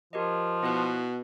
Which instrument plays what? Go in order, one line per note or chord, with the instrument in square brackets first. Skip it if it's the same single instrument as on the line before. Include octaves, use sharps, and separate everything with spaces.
[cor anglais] F3 [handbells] G4 A#4 D#5
[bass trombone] B2 [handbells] E4 B4